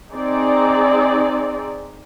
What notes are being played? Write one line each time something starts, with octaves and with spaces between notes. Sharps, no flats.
C4 D#4 G#4 D5